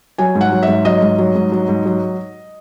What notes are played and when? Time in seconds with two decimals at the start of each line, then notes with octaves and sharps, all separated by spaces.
0.18 F#3 G#5
0.35 G#2
0.41 F#5
0.52 F#3
0.63 E5
0.68 G#2
0.85 F#3 D#5
1.02 G#2
1.18 F#3
1.35 G#2
1.52 F#3
1.68 G#2
1.86 F#3